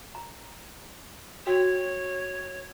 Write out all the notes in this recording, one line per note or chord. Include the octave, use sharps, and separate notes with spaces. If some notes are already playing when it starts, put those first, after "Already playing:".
A#5
F#4 C#5 G5 E6